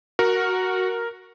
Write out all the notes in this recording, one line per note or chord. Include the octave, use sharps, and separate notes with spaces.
F#4 A#4